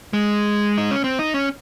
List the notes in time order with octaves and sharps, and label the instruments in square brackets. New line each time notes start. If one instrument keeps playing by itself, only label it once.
[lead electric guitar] G#3
D#4
C#4
C4
D#4
C#4